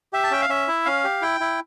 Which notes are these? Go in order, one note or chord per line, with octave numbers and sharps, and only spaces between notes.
G4 E5
A5
C#4 G5
F5
C#4 E5
E4
C#4 F5
G4
E4 G5
E4